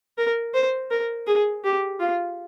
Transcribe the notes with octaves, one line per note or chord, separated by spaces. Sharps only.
A#4
C5
A#4
G#4
G4
F4